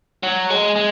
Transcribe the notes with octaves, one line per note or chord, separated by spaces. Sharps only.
F#3
G#3
G#3